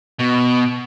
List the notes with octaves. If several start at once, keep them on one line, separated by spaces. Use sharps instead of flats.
B2